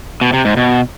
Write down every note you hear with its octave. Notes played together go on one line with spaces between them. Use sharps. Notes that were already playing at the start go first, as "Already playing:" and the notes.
B2
C3
G#2
B2